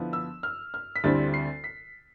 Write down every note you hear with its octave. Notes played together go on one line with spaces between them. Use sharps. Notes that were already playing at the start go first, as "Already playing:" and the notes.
Already playing: D3 F3 B3 E4
E6
F6
F6
B6
D2 D3 G3 C4 E4 A6
C7
B6